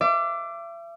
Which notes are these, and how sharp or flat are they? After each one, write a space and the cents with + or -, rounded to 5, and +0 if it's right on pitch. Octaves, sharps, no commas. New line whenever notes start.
E5 +40 D6 +0